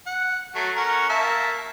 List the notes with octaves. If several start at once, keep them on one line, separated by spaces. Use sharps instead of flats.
F#5
F#3 A3
C#4 F#4 A#4
A#3 E5 A5